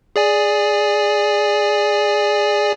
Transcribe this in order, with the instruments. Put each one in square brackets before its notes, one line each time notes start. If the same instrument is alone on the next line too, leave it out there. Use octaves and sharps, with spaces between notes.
[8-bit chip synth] G#4 D5 G#5